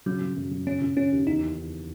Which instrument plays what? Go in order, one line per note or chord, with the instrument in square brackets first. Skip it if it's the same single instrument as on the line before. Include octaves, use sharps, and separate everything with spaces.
[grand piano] C#3 [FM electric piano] F#3
[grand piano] C#3
F#2
C#3
[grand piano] C#3 [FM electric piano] C#4
[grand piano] C#3
[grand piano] C#3 [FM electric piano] C#4
[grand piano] D#2
[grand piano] E2 [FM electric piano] D#4